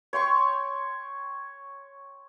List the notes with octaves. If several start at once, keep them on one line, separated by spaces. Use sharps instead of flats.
C#5 G5 C6 C#6